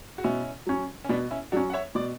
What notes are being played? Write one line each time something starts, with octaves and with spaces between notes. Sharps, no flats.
F#4
B2 C#4 E4
F#3 C#4
C#4
B2 B3 D4
C#4 E4
F#3 C#4 D4 F#4
F#5
C#5 E5
B2 D5